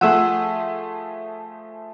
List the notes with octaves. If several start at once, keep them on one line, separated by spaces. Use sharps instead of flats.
F3 A3 G#4 F#5 E6